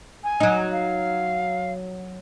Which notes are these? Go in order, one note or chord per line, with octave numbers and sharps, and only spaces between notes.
G#5
F#3 D#4
F5